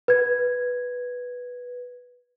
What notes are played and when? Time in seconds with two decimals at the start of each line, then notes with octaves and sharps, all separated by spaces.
0.08 B4 G#6